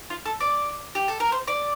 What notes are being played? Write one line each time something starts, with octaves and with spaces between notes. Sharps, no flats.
F4
A4
D5
G4
A4
A#4
C5
D5